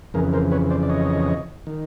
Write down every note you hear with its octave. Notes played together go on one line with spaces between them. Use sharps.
F2 C#3 E3 G#4 A#4
A#4 C5
B4 C#5
C5 D5
D5
C#5 D#5
D#3